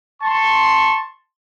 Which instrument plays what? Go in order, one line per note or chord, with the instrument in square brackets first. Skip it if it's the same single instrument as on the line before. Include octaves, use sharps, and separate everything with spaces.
[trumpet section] A5 C6 C#6